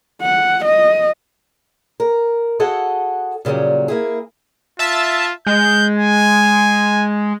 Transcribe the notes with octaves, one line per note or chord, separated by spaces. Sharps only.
F#5
D#5
A#4
F#4 G#4 A4 D#5 F5 F#5
A#2 C#3 E3 F#3 G3
A#3 E4 G#4
F4 E5 A5
G#3 G6
G#5